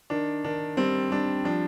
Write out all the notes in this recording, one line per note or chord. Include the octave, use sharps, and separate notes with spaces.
D#3 D4
D#3 D4
G3 C4
G3 D4
F3 D4